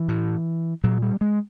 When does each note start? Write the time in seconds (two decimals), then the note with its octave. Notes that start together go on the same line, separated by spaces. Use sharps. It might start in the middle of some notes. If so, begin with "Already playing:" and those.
Already playing: E3
0.08 A2
0.84 A#2 F#3
1.02 G3
1.21 G#3